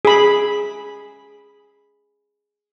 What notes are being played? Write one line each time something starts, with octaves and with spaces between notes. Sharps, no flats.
G#4 B5